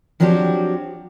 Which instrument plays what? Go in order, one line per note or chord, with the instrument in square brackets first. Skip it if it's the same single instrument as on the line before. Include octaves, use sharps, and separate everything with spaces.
[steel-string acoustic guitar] F3 F#3 C4 D4 F#4 G4